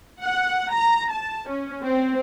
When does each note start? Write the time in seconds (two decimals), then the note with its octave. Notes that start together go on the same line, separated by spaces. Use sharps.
0.22 F#5
0.73 A#5
1.12 A5
1.49 C#4
1.83 C4